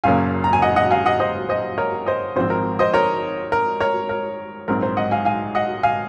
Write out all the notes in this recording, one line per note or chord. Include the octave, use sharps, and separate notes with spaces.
F#1 F#2 C#3 F#3 A#3 F5 G#5
A#5
G#5
D#5 F#5
D#5 F#5
F5 G#5
D#5 F#5
C5 D#5
C5 D#5
A#4 C#5
C5 D#5
G#1 G#2 F3 C4 C5
A#4
C5 D#5
A#4 C#5
A#4
A#4 C#5
A#4
A#1 G#2 F#3 C4 A#4
C5
D#5 F#5
F5 G#5
F5 G#5
D#5 F#5
F5 G#5